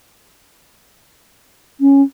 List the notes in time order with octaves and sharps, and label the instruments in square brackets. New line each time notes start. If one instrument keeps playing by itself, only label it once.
[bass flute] C#4